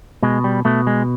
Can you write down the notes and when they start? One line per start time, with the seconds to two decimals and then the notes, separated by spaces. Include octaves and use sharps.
0.23 B2 G#3
0.44 G3
0.65 B2 A3
0.87 G#3